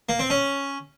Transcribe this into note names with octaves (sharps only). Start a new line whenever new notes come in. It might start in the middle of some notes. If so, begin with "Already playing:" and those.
A#3
C4
C#4